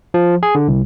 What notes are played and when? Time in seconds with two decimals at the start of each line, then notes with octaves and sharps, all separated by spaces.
0.14 F3
0.43 G#4
0.55 D3
0.68 C2